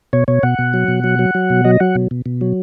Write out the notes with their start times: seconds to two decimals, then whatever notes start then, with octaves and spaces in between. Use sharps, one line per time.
0.13 B2 C#5
0.28 B2 C#5
0.43 B2 F#5
0.59 B2
0.74 F#3
0.88 B2
1.04 F#3
1.19 F#3
1.35 F#3
1.50 B2
1.64 F#3 D#5
1.80 F#3 F#5
1.95 B2
2.11 B2
2.26 B2
2.41 F#3